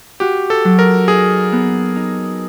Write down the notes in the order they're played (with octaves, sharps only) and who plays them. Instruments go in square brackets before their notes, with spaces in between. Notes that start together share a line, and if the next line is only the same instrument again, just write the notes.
[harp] F#4 [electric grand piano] G4
[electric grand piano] A4
[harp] F#3
[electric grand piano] A#4
[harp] D#4 [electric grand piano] G#4
[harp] B3
D#4